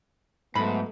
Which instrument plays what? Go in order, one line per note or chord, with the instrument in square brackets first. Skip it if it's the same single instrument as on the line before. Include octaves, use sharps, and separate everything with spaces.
[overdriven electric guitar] G#2 [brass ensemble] F#3 A3 B3 [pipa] B5